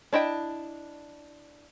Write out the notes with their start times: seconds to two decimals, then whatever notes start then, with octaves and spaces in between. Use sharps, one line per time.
0.13 D4 E4 D#5 G5